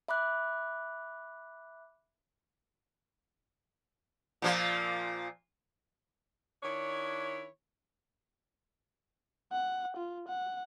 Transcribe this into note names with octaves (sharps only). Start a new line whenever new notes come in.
E5 B5 D6 F#6
A#2 F3 A#3
D#3 D4 E4 C#5
F#5
F4
F#5